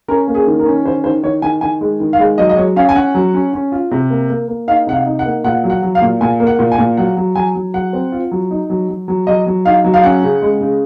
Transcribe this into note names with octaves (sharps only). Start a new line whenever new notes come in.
C#4 A#4
A#3
G#4
D#3
A#4
C#4
D#3 C5
D#3 C5
D#3 C#5
D#3 G#5
D#3 G#5
G#3
D#3
F5
G#3
F#3 D#5
D#5
F#3 C#5
C#4 F5
G#5
C#4 F#5
F#3
C#4
C#4
F4
C3
A#3
A#3
A#3
D#4 F5
C3 F#5
F5
D#4
F#5
A#3
A#2 F#5
F#3
F#5
F#3
F5
A#2
A#2 G#5
A#3
F#5
A#2
G#5
A#2
F#3 F#5
F#3
F#3 G#5
F#3
F#3 F#5
C4
F4
F#3
D#4
F#3
F#3
F#3
F#3 D#5
F#3
D#4 F5
F#3
F5
C#4 F#5
C#3
G#3
C#3